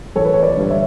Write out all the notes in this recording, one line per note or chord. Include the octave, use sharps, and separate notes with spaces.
A1 A4 C#5
B4
C#5
B4 D5
G2 D3
C#5 E5